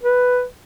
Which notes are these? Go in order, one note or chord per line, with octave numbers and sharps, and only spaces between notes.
B4